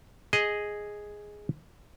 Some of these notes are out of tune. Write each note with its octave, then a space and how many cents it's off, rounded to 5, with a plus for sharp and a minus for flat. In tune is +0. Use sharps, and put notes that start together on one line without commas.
G#4 +0 D#5 +0